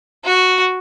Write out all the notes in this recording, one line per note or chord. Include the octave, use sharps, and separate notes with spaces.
F#4